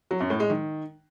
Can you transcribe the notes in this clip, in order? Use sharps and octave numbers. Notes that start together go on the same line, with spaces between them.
F#3
F#2
A2
G#3
D#3